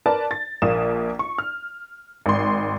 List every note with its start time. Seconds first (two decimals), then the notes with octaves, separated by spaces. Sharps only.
0.06 A#4 B4 D5 A5
0.31 A6
0.62 A#1 A#3 D#6 E7
1.19 C#6
1.38 F6
2.26 G#1 C6